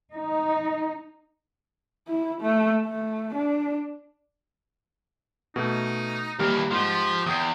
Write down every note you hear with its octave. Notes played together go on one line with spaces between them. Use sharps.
D#4
E4
A3
A3
D4
B2 A3 D#4
D#2 E3 G3 A#3 F6
G#2 F3 G4
E2 G5 D#6 G6 C7